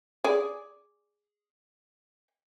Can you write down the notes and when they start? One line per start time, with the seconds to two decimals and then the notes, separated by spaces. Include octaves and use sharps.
0.24 G#4 D5